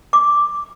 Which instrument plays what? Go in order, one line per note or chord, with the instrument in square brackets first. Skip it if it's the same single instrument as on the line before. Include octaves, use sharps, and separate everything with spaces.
[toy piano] D6